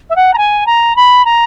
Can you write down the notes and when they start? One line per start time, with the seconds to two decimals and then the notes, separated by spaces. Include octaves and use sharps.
0.09 E5
0.16 F#5
0.33 A#5
0.38 G#5
0.66 A#5
0.96 B5
1.25 A#5